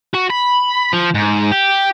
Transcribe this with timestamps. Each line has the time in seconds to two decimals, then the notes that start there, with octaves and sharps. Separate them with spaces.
0.14 F#4
0.30 B5
0.93 F3
1.14 G#2
1.51 G4